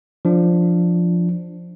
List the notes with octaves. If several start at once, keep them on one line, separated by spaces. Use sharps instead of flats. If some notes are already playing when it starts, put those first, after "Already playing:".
F3 D4